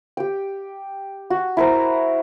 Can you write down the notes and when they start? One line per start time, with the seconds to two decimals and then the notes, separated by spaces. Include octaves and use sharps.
0.17 G4 G5
1.30 F#4
1.57 E4 A#4 C5 A#5